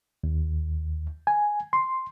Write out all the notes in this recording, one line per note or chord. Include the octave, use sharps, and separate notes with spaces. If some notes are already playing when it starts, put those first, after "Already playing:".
D#2
G#5
C6